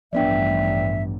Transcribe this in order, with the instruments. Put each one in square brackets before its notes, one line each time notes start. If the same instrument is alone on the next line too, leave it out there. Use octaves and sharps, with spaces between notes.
[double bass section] A1 G2 [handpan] F3 B3 D4 [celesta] D5 G5 [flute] E5